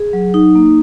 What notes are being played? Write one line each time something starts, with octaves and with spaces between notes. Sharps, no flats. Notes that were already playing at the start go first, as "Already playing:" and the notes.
Already playing: G#4
F#3
D#4
A#3